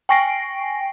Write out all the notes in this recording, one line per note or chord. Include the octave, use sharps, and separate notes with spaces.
G5 G#5 C#6 A#6 C7 D7